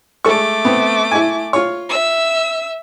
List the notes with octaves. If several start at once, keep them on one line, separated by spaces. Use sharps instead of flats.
G#3 A3 A4 C#6 D6
B3 C4
E4 G#5
F4 C#5
E5 E6